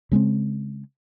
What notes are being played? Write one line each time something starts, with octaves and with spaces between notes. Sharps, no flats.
C#3 G#3 B3 C4